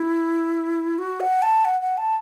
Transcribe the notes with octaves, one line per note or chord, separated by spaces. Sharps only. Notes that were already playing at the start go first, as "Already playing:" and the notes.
Already playing: E4
F#4
F#5
A5
F#5
F#5
A5